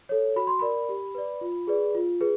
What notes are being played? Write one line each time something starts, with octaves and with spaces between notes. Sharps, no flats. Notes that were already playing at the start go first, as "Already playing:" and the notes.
A4 C#5
F#4 B5
C6
A#4 D5 B5
G4
B4 D5
F4
G#4 B4 D5
F4
G#4 B4